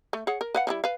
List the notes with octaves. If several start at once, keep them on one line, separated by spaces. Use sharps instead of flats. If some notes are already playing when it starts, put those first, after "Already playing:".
A3
G#4 C#5 F#5
A#4
B4 F5 F#5
F3 G3 E4
B4 F5